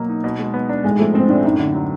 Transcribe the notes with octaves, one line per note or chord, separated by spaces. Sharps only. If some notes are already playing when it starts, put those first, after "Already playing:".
Already playing: B2 F#3 A#3
D#4
B2
G#3
B3
D4
A2 G#3
F3 A3
G#3 C4
A2 D4
F#2 D#4
D3
F#3